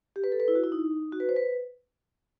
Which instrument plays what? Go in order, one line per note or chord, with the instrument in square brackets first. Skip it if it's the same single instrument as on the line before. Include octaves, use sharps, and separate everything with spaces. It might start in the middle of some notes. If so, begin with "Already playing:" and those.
[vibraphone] G4
B4
A4
B4
E4
F#4
E4
D#4
F#4
B4
C5
B4